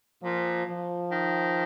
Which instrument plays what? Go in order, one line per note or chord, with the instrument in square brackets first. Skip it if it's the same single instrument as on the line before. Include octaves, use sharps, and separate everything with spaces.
[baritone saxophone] A#2 [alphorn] F3
[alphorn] F3
[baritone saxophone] D#3